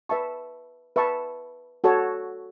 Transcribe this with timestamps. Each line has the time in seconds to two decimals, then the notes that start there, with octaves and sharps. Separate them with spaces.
0.09 B4 E5 A5 C#6
0.96 B4 E5 A5 C#6
1.84 F#4 A4 C#5